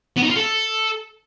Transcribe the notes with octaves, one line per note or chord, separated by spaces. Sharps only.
B3
D#4
F4
A4